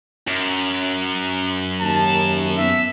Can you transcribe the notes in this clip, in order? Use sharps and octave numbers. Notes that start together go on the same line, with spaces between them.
F#2
D#2 A5
B3 E5